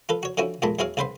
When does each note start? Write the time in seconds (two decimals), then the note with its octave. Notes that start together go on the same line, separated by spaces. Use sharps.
0.09 F4 A4 B4
0.23 F#4 C#5
0.37 D3 F3 C#4 E4 F#4
0.62 B1 F2 A#2 G#3 A5 B5
0.79 E2 F#3 E4 G#4 C#5 F5
0.97 C2 C#3 B4 C5 B5 C6